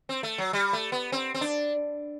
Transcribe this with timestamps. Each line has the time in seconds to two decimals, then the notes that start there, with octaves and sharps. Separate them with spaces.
0.09 C4
0.23 A3
0.38 F#3
0.53 G3
0.73 A3
0.92 B3
1.12 C4
1.34 C4
1.41 D4